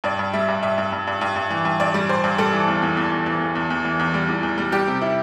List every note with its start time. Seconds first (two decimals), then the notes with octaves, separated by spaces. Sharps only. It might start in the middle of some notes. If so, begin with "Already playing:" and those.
0.04 G2 D5
0.19 G2
0.33 G3 E5
0.48 G2
0.63 G2 E5
0.78 G2
0.92 G2
1.07 G2
1.21 G2
1.36 G2
1.50 E3
1.65 G2
1.80 G2 D5
1.94 G3
2.09 G2 C5
2.24 G2
2.38 G3 A4
2.53 E3
2.67 E2
2.82 E2
2.97 E2
3.11 E2
3.26 E3
3.41 E2
3.55 E2
3.70 E2
3.85 E3
3.99 E2
4.14 G3
4.28 E2
4.43 E2
4.58 G3
4.72 G3 G4
4.87 C3
5.02 E4